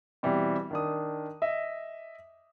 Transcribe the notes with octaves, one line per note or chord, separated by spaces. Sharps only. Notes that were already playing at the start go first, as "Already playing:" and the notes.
B2 E3 G3 C4
D#3 D4 D#6
D#5 E5